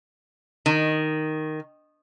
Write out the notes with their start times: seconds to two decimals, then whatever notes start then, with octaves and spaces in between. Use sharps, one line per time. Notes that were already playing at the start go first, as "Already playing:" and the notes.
0.66 D#3